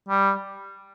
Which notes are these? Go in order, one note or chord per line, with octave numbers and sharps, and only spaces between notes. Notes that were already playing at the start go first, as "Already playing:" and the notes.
G3